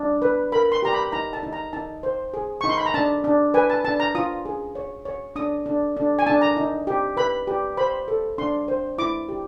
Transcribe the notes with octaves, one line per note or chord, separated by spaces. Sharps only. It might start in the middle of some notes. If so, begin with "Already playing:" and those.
Already playing: D4
B4
A#4 B5
C6
G4 A#5
B5
D#4 A#5
A5
D#4
A#5
D#4 A5
C5
G#4
D#4 C#6
C6
B5
A#5
D4 A5
D4
B4 G#5
A5
D4 A5
A#5
F4 D#6
G#4
C#5
C#5
D4 D#6
D4
D4
G#5
D4 A5
A#5
D#4
G4
B4 B5
G4
C5 B5
A4
D4 C6
C5
E4 D6
G4